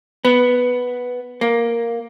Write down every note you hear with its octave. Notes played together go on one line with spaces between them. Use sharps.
B3
A#3